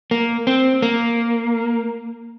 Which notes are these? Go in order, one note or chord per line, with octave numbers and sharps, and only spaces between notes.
A#3
C4
A#3